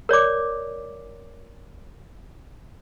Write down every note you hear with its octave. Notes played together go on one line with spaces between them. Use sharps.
A#4 C#5 D5 D6